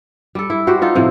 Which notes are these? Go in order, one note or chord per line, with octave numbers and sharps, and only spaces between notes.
G3 A4
E4
F#4 G4 C5
D#4 F4 A4
A2 C3 F3